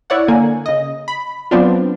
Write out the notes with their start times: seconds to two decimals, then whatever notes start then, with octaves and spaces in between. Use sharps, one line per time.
0.10 E4 C#5 D5 F#5
0.28 D3 A#3 G#5
0.66 C#3 D#5
1.08 B5
1.51 F#3 B3 C4 D4 F4